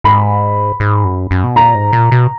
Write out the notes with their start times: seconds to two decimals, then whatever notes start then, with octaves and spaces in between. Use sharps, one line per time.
0.04 G#2 B5
0.80 G#2
1.04 F#2
1.31 F#2
1.44 B2
1.55 A#2 A#5
1.75 G#2
1.93 A#2
2.12 B2